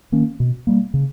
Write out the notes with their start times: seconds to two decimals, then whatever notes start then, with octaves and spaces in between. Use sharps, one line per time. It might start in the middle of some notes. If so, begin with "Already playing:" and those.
0.12 D#3 A#3 C#4
0.40 B2
0.67 G3 A#3
0.94 C#3